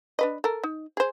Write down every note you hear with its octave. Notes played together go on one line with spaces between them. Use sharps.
D4 B4 D#5
A4 A#4
D#4
G#4 C5